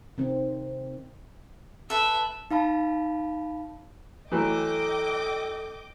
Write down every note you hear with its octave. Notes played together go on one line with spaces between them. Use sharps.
C3 D#3 C4
A4 B4 E5
D#4 F5 A5 B5
E3 F#3 A3 A4 D#5 G5 D6